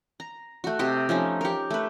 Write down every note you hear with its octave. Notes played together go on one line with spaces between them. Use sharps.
A#5
A3 F#4
C3 G4 D#5
F3 A3 C#4 D#4
G4 A#4
A3 B4